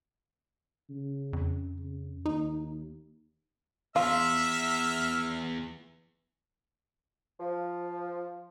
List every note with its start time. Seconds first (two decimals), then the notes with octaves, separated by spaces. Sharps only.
0.90 C#3
1.33 F2
1.78 C#3
2.26 D#2 D#4
3.96 E2 F4 E5 E6 F6
7.40 F3